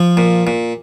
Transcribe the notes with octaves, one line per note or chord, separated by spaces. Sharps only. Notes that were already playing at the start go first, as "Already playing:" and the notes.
Already playing: F3
A#2
A#2